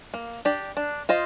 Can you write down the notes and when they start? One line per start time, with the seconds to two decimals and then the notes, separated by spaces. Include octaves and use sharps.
0.14 A#3
0.45 D4 G4 D5
0.77 D4
1.09 F4 C5 D#5